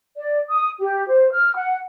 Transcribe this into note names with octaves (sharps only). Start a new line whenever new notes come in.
D5
D#6
G4
C5
F6
F#5